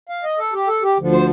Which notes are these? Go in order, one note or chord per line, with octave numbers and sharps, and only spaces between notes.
F5
D#5
A4
G4
A4
G4
D2 D3 F3
C5